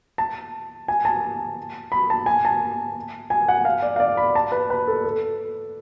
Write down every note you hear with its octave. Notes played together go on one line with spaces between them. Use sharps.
A5
G#5
A5
B5
A5
G#5
A5
G#5
F#5
F5
D5
F5
D5
B5
A5
B4
B4
A4
A4